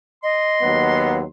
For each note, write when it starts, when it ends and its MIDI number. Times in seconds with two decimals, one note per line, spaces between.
0.23 1.18 75
0.23 1.27 84
0.62 1.24 39
0.62 1.24 54
0.62 1.24 59